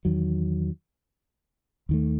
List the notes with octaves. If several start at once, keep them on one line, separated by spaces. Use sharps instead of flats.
E2 D#3 F#3
D#2 D#3 A3